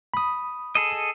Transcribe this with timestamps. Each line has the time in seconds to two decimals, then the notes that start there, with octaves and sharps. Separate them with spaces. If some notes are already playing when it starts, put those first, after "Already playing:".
0.14 B5 D#6
0.75 G#4 A4 D#5